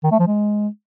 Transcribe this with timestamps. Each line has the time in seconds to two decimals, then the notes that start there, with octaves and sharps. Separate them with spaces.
0.03 D#3
0.11 A3
0.19 F3
0.27 G#3